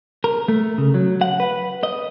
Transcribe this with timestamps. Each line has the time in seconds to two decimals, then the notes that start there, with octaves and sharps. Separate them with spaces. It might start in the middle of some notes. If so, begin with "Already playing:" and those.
0.24 A#4
0.48 A3
0.78 C#3
0.94 F#3
1.21 F#5
1.40 B4
1.83 D#5